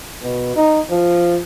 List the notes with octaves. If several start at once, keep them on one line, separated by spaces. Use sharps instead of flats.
B2
D#4
F3